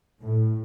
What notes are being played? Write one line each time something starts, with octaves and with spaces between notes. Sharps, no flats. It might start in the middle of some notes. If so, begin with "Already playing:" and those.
A2